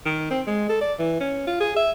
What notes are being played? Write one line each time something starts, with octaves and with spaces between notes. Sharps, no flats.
D#3
C4
G#3
A4
D5
E3
C#4
F4
G#4
E5